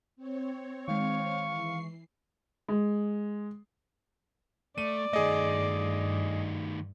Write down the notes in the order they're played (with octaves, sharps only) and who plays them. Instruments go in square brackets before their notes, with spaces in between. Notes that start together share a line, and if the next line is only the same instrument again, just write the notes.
[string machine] C4 C#5
[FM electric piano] D#3 G#3 [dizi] F5 [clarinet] C#6
[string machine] E3 C7
[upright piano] G#3
[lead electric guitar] A3 [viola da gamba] D5 [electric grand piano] D#7
[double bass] G2 [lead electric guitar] D#3 A3 [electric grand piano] G#4 D#5